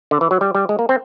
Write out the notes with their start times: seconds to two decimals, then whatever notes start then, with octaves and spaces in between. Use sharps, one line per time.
0.11 D3
0.21 E3
0.31 F#3
0.41 G3
0.55 G3
0.69 G#3
0.79 A#3
0.89 C4